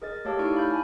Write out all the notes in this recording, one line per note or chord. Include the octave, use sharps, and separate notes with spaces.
G#4 A#4 D#5 A6
A3 G4 C#5 F5 A5 E6
D#4 E4 D5 C#6 F6 D7
F5 B5 F6 G6
F5 G#5 A5 B5